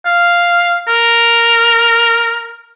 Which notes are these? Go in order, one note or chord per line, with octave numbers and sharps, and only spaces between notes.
F5
A#4